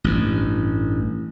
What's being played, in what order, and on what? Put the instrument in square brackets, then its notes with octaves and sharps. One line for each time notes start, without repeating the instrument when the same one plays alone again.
[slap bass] A1 G2